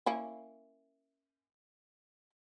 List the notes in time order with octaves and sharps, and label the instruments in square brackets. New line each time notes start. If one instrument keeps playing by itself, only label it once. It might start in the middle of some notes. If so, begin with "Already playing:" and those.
[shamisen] A#3 C#4 E4